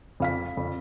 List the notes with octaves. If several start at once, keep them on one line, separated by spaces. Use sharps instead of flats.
F2 F5 B6
F2